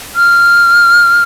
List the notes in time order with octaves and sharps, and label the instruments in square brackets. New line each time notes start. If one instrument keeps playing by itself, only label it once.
[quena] F6